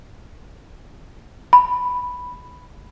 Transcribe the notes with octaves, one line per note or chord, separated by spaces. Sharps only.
B5